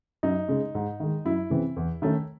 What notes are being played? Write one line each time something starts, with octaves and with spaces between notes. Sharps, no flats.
F#2 D#4
C#3 G#3
G#2
D#3 G#3
F#2 E4
C#3 E3 C4
E2
D#3 A3 C#4